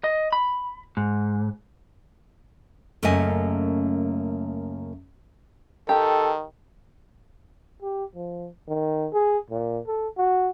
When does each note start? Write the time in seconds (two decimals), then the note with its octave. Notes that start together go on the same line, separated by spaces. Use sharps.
0.04 D#5
0.32 B5
0.97 G#2
3.03 F#2 C#3 A3 A#3 D#5 G#5
5.89 D#3 G4 A4
7.82 G4
8.15 F3
8.68 D#3
9.13 G#4
9.50 A#2
9.87 A4
10.17 F#4